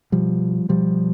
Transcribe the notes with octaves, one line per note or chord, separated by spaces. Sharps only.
B2 F3 G3
B2 F3 G3